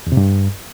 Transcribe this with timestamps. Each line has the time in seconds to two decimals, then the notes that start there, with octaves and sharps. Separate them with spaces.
0.07 E2
0.12 C3
0.17 G2